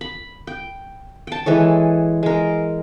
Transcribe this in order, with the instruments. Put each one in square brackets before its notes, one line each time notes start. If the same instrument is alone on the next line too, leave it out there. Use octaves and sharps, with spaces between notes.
[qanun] B5
G5
G5 A5
E3 G#3 A4 C#5
G#3 A#4